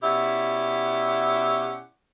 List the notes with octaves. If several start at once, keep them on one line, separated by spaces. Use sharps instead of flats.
B2 C#4 E4 G4 D5 F#5